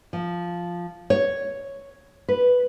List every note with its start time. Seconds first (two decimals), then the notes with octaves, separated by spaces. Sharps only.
0.13 F3
1.10 C#5
2.28 B4